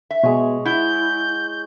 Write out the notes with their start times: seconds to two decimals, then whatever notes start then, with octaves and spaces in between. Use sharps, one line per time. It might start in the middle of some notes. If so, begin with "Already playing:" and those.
0.11 E5
0.23 B2 G#3 C#5
0.65 E4 F#5 G6